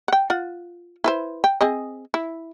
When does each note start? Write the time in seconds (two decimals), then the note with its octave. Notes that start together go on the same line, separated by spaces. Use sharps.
0.08 F#5 G5
0.30 F4 F#5
1.04 E4 B4 C5
1.44 G5
1.61 C4 G#4 D#5
2.14 E4